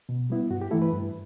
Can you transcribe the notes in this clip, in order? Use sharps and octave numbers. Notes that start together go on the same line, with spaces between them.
B2
G3 B3 E4
G2 F#4
G4
E3 A3 E4 A4
B4
G2